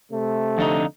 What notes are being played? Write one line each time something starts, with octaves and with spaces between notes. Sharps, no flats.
C3 A3
F2 D3 D#4